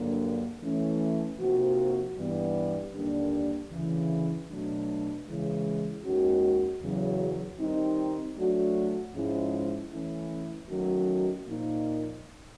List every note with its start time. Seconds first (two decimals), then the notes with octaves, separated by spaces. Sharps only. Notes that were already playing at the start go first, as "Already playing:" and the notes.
Already playing: G2 D3 F#3 A#3
0.62 E3 A3 C#4
1.39 C3 F3 A#3 D#4 F#4
2.16 G2 E3 G3 B3
2.94 D#2 D3 G3 A#3 D4
3.71 D2 C#3 E3
4.48 B2 F#3 A3 D4
5.26 C#3 E3 G#3
6.04 D#2 D#3 G#3 C#4 F#4
6.81 E2 C#3 F#3
7.59 D#3 G3 C4 D#4
8.36 F#3 A3 D4 F#4
9.14 G#2 F3 G#3 C#4 E4
9.91 E3 A3 C#4 E4
10.68 D#3 F#3 A3 C#4 F#4
11.46 A#2 F3 A#3 D#4